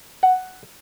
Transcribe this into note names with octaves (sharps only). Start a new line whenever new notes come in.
F#5